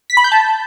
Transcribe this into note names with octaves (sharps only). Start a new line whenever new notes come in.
B6
B5
G6
A5